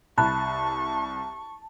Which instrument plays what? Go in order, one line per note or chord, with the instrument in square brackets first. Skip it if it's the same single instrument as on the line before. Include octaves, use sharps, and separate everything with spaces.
[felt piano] C2 [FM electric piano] A5 [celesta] B5 F#6 [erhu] C#6